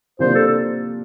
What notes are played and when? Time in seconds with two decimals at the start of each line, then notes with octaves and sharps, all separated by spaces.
0.19 C3 F3 A#3 D4 F4 C5
0.35 A4